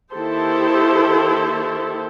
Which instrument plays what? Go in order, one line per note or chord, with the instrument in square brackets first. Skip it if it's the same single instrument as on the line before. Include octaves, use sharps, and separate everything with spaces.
[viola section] D#3 A#3 E4 G4 A4 C5